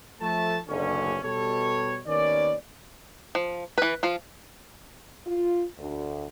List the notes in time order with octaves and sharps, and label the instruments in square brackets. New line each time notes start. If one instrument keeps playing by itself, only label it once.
[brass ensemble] F3 A3 A5
F#1 B1 D3 C#4
B2 G3 A4 C#5
D#2 D#3 B3 C#4 D5
[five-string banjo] F3
E3 B4
F3 F4
[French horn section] F4
D2